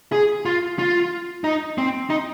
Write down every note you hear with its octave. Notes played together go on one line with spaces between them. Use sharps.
G#4
F4
F4
D#4
C4
D#4